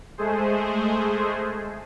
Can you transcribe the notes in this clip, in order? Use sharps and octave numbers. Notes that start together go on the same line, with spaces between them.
G#3 A3 G#4 C5